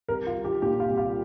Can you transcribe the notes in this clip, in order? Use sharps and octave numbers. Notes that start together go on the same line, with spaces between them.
C2 A#4
F4
G3
G4
A#2 G4
F4
C2
F4